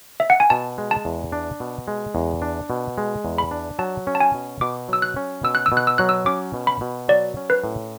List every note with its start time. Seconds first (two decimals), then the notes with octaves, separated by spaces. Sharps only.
0.20 E5
0.30 F#5
0.40 G#5
0.50 B2 A5
0.78 G#3
0.91 A5
1.05 E2
1.32 D4
1.60 B2
1.88 G#3
2.15 E2
2.42 D4
2.70 B2
2.98 G#3
3.25 E2
3.38 B5
3.51 D4
3.79 F#3 A5
4.07 C#4
4.15 A5
4.20 G#5
4.34 B2
4.61 B2 D6
4.88 F#3 E6
5.02 F#6
5.16 C#4
5.43 B2 E6
5.55 F#6
5.66 E6
5.72 B2
5.77 F#6
5.87 E6
5.98 F#3 F#6
6.09 E6
6.26 C#4 D6
6.54 B2
6.67 B5
6.81 B2
7.08 F#3 D5
7.37 C#4
7.50 B4
7.64 A2